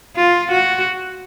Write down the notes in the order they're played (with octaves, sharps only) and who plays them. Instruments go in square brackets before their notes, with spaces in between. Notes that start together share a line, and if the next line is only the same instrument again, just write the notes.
[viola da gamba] F4
F#4